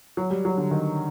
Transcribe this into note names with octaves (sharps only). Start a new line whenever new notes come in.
F#3
G3
F#3
D3
D#3